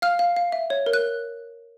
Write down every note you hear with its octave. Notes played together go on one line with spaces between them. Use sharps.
F5 F6
F5
F5
E5
C#5
A#4
F#6